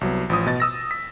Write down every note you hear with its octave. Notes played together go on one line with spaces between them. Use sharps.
C2 F#3 B3
A1 F3 D#6
B2 D#5 A6
D#6 E6 A#6
B6